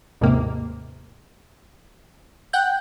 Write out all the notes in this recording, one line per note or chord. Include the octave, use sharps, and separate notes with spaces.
A1 D#2 G#2 C3 A#3
F#5 G5 F#6 G6